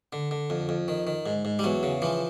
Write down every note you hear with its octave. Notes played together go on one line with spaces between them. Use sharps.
D3
D3
F2
F2
D#3
D#3
G#2
G#2
G3
E2 F#3
C#3
E3 F3